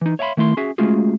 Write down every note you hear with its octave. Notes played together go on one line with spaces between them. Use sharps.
E3 D#4
C#5 E5 F5 G5 B5 C6
D#3 A3 E4 C6
C#4 F#4 G#4 E5
G#3 A3 C#4 F4 F#4 G#4